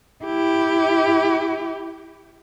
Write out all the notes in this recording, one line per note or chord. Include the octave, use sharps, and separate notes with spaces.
E4 G4